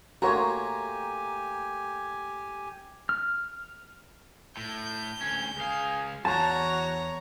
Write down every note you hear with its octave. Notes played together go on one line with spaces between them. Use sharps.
A2 A#3 F#4 G4 C#5 G#5 A#5 C6
F6
A2 G6
D2 C#4
C#2 G#4 F5
E2 F#4 C#5 A5 A#5